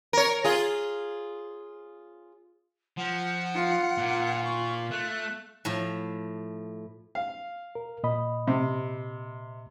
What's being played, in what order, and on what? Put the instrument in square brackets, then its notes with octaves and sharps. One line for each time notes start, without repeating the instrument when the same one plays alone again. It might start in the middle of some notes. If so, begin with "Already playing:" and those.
[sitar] A#4 C#5
F4 G#4
[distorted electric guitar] F3 [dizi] F#5
[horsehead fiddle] F4
[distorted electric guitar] A#2
[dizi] C#6
[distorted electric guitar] A3 [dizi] F#6
[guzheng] A2 F3
[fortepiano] F5
[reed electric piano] A#4
A#2 D#5 B5
[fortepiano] C3